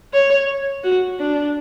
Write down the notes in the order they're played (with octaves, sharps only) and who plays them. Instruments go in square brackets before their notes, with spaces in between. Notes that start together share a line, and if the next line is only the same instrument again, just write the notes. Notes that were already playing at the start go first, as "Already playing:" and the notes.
[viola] C#5
F#4
D4